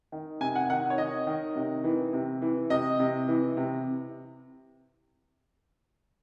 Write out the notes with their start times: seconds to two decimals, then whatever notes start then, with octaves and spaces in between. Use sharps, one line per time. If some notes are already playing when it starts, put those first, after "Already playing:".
0.12 D#3
0.40 C3 G#5
0.55 F#5
0.69 D#3 F#5
0.90 C#5
0.98 D#3 D#5
1.27 D#3
1.56 C3
1.84 E3
2.13 C3
2.42 E3
2.70 C3 D#5
2.99 C3
3.28 E3
3.57 C3